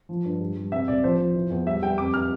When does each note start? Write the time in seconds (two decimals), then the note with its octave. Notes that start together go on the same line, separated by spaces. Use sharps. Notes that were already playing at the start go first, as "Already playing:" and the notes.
0.09 F3
0.25 G2
0.41 G3
0.57 G3
0.71 C3 E5
0.88 C2 D5
1.03 F3 C5
1.19 F3
1.35 E3
1.50 E2
1.66 G3 E5
1.82 G3 G5
1.98 F2 D6
2.14 F6